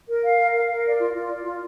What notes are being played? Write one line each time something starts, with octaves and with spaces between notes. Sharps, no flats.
A#4
F5
A#4
F5
A#4
D5
F4
F4
D5
F4